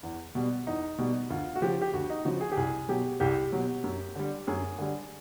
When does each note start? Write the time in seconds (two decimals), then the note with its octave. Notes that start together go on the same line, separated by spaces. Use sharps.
0.03 E2
0.35 B2 G3
0.67 E2 D#4
0.98 B2 G3
1.30 D2 F4
1.55 F#4
1.62 C#3 F3 G4
1.82 G4
1.93 D2 F#4
2.10 D#4
2.25 C#3 F3 F#4
2.41 G#4
2.52 G4
2.57 C2 G#4
2.88 B2 F#3 G4
3.20 C2 G4
3.52 B2 F#3
3.84 F#2
4.15 D3 G3
4.47 F#2 G#4
4.78 D3 G3